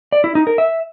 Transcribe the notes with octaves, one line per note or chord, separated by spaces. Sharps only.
D5
E4
D#4
A#4
E5